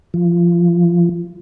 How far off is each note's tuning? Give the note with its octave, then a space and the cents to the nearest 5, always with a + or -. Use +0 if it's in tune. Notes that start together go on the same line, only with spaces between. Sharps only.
F3 -20